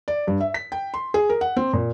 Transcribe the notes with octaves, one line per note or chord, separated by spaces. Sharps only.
D5
G2
E5
B6
G5
C6
G#4
A#4
F#5
C4
A#2